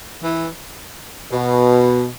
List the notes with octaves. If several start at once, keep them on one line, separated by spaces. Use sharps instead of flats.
E3
B2